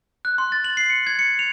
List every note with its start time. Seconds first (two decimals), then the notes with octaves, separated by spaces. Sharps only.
0.25 F#6
0.38 C6
0.52 A6
0.64 F#7
0.77 C7
0.90 C#7
1.07 G#6
1.19 C#7
1.39 F7